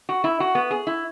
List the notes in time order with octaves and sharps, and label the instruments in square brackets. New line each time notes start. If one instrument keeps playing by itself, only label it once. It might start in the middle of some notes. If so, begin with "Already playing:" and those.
[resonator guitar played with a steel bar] F#4
E4
F#4
B3
G#4
E4